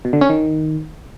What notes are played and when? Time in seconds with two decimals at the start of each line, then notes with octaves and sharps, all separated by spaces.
0.05 B2
0.13 D3
0.21 C#4
0.30 D#3